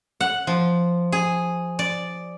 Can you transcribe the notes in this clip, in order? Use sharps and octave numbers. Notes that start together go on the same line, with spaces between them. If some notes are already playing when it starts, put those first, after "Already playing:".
F#5
F3
G#4
D5